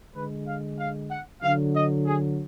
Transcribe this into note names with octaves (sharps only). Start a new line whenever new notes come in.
D3 G#3 B4
F5
F5
F#5
D3 F#3 F5
D#5
G#4